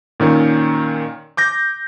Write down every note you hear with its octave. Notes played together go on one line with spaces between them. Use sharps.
A#2 D#3 C#4
D6 G6 A#6